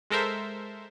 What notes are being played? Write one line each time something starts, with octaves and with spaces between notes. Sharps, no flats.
G#3 A4 A#4 C5 E5